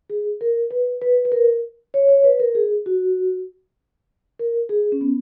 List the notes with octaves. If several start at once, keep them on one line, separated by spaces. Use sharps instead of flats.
G#4
A#4
B4
B4
B4
A#4
C#5
C#5
B4
A#4
G#4
F#4
A#4
G#4
C#4
B3